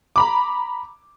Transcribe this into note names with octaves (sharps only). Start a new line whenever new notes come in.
A#5 B5 D6